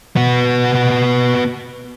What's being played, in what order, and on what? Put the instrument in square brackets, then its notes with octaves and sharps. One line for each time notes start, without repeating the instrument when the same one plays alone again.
[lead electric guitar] B3 F#4